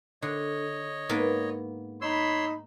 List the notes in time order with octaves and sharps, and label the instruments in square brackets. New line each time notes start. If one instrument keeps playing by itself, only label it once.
[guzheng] D3 [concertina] C#5 D#5
[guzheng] G#2 A#3 B3
[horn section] D#4 B5 [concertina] C#5 C6 E6